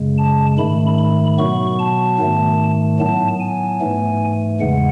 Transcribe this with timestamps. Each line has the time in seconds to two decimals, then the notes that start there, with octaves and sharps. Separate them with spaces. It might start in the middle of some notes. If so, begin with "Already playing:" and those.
Already playing: F#2 C#3 G#3
0.18 A5
0.58 G#2 D#3 A3 B5
0.98 B5
1.38 B2 F#3 B3 C#6
1.79 A5
2.19 G#2 D#3 A3
2.99 A2 F#3 B3 A5
3.40 G#5
3.80 G#2 E3 A3
4.60 E2 C#3 G#3 F#5